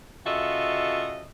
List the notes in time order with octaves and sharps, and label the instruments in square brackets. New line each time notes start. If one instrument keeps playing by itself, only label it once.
[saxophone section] C#3 F4 F#4 A4 D#5 E5